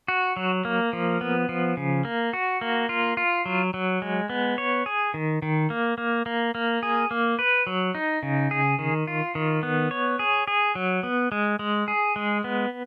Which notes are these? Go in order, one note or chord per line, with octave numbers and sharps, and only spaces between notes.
F#4
F#3
A#3
F3
B3
F3
C#3
A#3
F#4
A#3
F4
F4
F#3
F#3
G#3
B3
C#5
G#4
D#3
D#3
A#3
A#3
A#3
A#3
G#4
A#3
B4
F#3
D#4
C#3
G#4
D#3
F4
D#3
B3
C#5
G#4
G#4
F#3
B3
G#3
G#3
G#4
G#3
B3